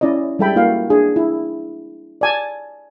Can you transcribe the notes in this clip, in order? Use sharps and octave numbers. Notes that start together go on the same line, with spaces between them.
C#4 E4 D5 D#5
G3 G#3 A4 E5 G5 B5
A#3 E4 F#4 A4 F5
D4 G#4
E4
D5 G#5 A5